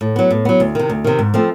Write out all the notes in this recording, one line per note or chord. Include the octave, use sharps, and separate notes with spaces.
A2
F#3 B3
A2
F#3 B3
D2
C3 D#3
D2
C3 D#3
G#2
F3 A3 C4